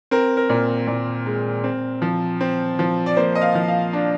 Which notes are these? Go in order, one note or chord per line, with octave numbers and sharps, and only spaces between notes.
C4 A#4
A#4
A#2
A#2
G#3
C4
F3
C4
F3
D5
A#3 C5
D#5
F5
F3
F5
D4